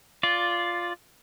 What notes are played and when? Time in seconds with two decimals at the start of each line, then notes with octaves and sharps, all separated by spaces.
0.23 F4 D5